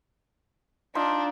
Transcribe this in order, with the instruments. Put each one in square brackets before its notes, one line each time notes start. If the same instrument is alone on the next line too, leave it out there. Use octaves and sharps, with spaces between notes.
[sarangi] D4 [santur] D#4 F4